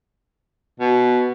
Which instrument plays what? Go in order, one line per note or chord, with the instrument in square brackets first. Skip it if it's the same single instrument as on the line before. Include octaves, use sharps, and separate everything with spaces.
[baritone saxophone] B2